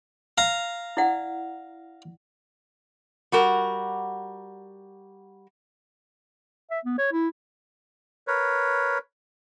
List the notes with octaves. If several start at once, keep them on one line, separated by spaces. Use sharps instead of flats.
F5 A#5
E4 D5 F#5
G3 F#4 A#4
E5
B3
C#5
E4
A#4 B4 C#5